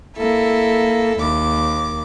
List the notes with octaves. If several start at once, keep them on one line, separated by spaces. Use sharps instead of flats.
A#3 E4 A4
D#2 D6